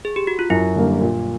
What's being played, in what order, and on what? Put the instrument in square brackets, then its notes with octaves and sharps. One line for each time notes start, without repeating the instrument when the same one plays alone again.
[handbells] G#4
G4
F#4
F4
[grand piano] F#2 [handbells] E4
[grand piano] D3 G3 A#3
A#2